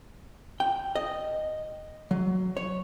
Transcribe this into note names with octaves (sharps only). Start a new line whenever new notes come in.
G5
D#5
F#3
C#5